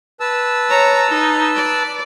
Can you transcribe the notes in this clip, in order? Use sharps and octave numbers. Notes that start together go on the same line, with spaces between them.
B4 A5 E6
C#5 A#5
D#4
D5